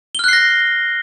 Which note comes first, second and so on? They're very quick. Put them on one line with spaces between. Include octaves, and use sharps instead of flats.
G7 F6 F#6 C7 A#6